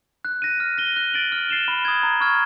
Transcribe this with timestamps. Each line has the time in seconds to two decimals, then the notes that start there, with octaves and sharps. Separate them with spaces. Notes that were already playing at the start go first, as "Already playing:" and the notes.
0.25 F#6
0.42 A#6 D#7
0.60 F6
0.78 A#6 D#7 G7
0.96 F#6
1.14 A6 D7 F#7
1.32 F6
1.49 A6 C7 E7 G7
1.68 B5
1.85 D#6 G#6
2.03 A#5
2.21 C#6 F6 G#6